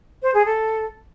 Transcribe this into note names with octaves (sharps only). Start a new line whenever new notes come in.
C5
G#4
A4